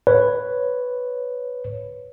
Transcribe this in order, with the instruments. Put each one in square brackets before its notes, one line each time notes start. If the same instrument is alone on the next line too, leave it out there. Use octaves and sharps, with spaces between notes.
[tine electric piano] B4 C#5